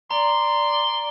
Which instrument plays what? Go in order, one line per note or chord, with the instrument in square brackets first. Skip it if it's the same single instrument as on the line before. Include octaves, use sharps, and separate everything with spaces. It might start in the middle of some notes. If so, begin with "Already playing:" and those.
[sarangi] D5 [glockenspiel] A#5 [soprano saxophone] C6